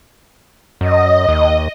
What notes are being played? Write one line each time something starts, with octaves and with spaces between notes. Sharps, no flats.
F#2 D#5
D#2